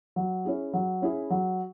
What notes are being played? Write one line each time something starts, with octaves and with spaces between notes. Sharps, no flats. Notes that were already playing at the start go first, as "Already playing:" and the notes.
F#3
C#4 E4 G#4
F#3
C#4 E4 G#4
F#3